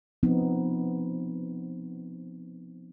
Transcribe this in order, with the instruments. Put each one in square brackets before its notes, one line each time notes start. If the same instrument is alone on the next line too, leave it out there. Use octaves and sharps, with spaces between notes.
[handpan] F3 B3 C4 D#4